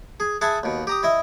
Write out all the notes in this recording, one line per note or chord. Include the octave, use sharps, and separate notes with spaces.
G#4
G#4 E5 F#5 G#5 A5 B5
D#2 B2
G4 A#5 D#6
E4 D#5 E5